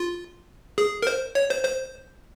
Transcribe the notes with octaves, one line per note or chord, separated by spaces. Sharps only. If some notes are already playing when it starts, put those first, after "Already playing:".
Already playing: F4
G#4
A#4
C5
C#5
C5
C5